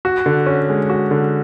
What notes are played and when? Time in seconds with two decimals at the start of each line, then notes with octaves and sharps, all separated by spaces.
0.05 F#4
0.26 D3
0.46 C#4
0.69 G#3
0.90 F#4
1.11 D3